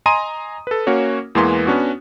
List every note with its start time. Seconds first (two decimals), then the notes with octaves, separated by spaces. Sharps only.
0.06 D#5 G#5 A#5 C6 D#6 D#7
0.67 A4 B4
0.87 A#3 C#4 F#4 C#5
1.35 E2 E3 G#3 A#3 B3 C6
1.67 B3 C#4 D4 F#4